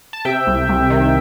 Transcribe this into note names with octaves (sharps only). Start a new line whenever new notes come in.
A5
C3 E5 G5
C2
C2
D#3